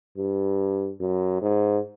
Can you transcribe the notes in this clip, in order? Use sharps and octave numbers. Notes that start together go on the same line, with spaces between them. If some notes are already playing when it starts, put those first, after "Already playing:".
G2
F#2
G#2